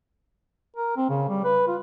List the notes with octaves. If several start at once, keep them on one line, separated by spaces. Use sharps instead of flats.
A#4
C4
C#3
G3
B4
F4